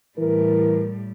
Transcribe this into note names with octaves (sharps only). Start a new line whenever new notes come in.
A2 E3 G3 A#4